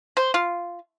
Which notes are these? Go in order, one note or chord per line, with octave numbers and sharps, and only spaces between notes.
C5
F4